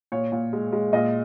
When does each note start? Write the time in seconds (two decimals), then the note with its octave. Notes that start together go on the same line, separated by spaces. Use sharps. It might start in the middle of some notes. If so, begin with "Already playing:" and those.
0.12 A#2 C#5
0.32 A#2
0.53 G#3
0.73 G#3
0.93 A#2 D#5